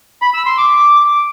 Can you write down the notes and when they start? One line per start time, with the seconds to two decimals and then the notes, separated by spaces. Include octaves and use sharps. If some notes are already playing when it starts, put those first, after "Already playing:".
0.22 B5
0.34 E6
0.46 C6
0.58 D6